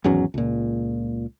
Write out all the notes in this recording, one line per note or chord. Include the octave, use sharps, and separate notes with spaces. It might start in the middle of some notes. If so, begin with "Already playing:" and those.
G#1 E2 F#3 C#4
C#2 A#2